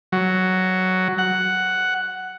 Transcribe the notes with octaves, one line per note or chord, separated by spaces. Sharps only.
F#3
F#5